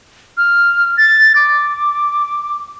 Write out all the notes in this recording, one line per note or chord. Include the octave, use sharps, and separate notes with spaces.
F6
A6
D6